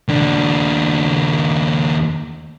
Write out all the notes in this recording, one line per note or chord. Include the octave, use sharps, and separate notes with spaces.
D#2 D4